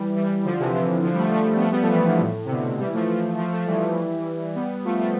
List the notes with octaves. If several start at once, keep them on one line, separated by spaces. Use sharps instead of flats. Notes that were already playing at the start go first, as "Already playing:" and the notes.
Already playing: E3 G3
E3 G3
D3 F3
C3 E3
C3 E3
D3 F3
G3
F3 A3
F3 A3
B3
F3 A3
G3 B3
F3 A3
E3 G3
D3 F3
A2
C3
B2 D3
E3 G3
F3 A3
F3 A3
F3 A3
F3 A3
E3 G3
G3 B3
F3 A3
F3 A3